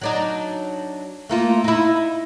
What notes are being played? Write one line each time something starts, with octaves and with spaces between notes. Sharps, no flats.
F#3 D4 D#4
A3 A#3 F4
D#4 E4